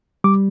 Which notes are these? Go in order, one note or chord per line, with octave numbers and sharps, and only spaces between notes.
G3 D6